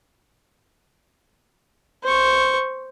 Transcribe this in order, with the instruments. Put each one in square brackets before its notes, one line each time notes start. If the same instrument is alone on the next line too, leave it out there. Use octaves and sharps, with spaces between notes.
[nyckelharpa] C5 C#6